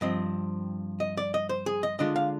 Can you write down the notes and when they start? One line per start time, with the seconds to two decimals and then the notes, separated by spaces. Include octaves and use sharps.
0.01 G2 F3 C4 D#5
1.00 D#5
1.17 D5
1.34 D#5
1.49 C5
1.66 G#4
1.83 D#5
1.99 D3 G#3 D4 F4 D#5
2.16 F5